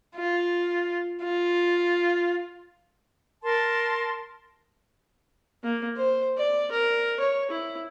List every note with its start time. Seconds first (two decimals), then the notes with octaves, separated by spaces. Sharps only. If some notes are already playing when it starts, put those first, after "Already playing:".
0.16 F4
1.23 F4
3.44 A#4 A5 C6
5.64 A#3
5.97 C5
6.38 D5
6.72 A#4
7.20 C#5
7.51 E4